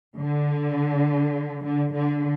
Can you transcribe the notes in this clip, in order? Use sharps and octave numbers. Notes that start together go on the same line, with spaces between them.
D3
D3
D3